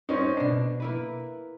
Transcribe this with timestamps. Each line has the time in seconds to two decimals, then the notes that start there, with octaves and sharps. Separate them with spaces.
0.09 C4 C#4 D#4 C5
0.37 B2 D4 C7
0.80 A#3 E4 B4